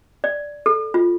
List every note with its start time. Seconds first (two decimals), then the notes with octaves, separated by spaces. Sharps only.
0.24 D5
0.66 A4
0.94 F4